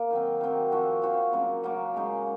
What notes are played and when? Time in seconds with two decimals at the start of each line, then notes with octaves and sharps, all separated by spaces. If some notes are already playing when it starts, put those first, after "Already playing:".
Already playing: A#3
0.11 D#3 F#3 C4
0.41 D#3 F#3 C4
0.72 F3 C4 F#4
1.02 F3 C4 F#4
1.33 C#3 F#3 A#3
1.63 C#3 F#3 A#3
1.94 C#3 G#3 D#4